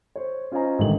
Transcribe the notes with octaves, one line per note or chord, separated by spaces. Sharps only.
C5 C#5
C#4 F4 C5 D#5 G#5 A#5
A1 G#2 D3 D#3 G#3 F#7